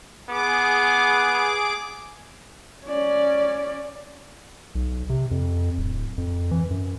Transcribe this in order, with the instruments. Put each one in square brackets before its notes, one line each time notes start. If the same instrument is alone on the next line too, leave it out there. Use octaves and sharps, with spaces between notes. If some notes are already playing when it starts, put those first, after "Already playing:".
[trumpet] B3 [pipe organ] G#4 D6
[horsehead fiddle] C#4 D5
[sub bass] B1
C3
F2
D1
F2
E3
F#2